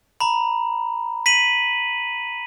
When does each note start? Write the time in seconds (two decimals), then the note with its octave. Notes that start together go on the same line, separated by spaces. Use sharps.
0.20 A#5 B5
1.26 B6 D#7 F#7